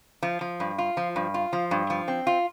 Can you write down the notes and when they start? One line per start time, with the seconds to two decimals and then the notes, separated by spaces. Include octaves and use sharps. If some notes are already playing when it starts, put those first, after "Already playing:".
0.23 F3
0.41 F3
0.60 G2
0.78 F4
0.97 F3
1.16 G2
1.34 F4
1.53 F3
1.71 G2
1.90 F3
2.08 C4
2.27 F4